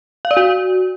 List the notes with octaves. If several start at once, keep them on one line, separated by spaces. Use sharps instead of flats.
F5
D5
F#4